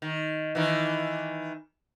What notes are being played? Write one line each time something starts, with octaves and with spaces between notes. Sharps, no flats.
D#3
D#3 E3